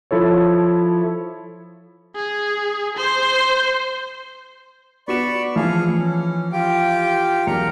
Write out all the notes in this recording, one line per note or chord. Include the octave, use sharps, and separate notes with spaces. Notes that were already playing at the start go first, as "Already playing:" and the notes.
F3 E4 A4 C#5
G#4
C5
B3 F#4 D5 B5 C#6 E7
E3 F3 G#4 F5
C#4
F4 G4 G5
B1 E2 A#4 A#5 C#7